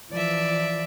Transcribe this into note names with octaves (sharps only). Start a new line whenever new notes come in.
E3 F3 D5 E5